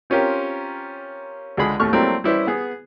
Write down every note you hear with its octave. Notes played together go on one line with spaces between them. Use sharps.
C4 C#4 F4 G4 A#4
C#2 D3 G#3 G#4 B5 D#6
D#2 A2 A3 C#6 F6
F#3 G3 A3 A#3 C4 E4
G3 C#4 E4 G4 B4 C5
B3 G#4